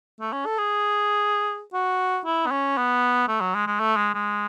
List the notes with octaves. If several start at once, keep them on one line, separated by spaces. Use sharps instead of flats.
A3
C#4
A4
G#4
F#4
E4
B3
C#4
B3
A3
F#3
G#3
G#3
A3
G#3
G#3